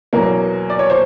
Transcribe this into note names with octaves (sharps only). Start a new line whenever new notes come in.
E2 B2 F#3 A#3 A#4
D5
C#5
C5